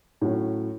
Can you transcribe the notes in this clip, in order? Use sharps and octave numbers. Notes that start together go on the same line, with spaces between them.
A2 F#3 C#4